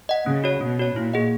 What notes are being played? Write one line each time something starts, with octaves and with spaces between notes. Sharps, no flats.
D#5 F#5
C#3 C#4
F#4 C#5
B2 C#4
F#4 C#5
A#2 E4
G#4 D#5 F#5